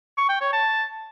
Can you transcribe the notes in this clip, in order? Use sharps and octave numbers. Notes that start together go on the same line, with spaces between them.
C#6
G5
C#5
A5